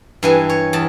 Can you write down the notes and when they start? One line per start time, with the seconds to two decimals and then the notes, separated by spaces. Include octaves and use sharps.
0.23 G2 E3 G#5
0.49 C#5
0.73 E2 A5